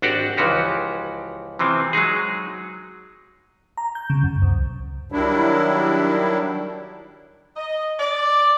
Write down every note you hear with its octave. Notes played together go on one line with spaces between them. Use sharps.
G#1 D4 F#4 G4 D5 F#5
C#2 E3 F3 F#4 G4
C3 E3 F3 C4
F#3 G#3 D#4 G#4
A#5
G6
C#3
F#2
C2
D#3 F#3 G3 D4 E4
D#5
D5